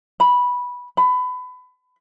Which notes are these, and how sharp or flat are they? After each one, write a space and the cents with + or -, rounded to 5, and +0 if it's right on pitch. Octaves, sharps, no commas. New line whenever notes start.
B5 -10
B5 +25